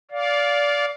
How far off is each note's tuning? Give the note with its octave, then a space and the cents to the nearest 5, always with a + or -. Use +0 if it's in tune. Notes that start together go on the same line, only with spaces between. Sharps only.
D5 -20 F5 +10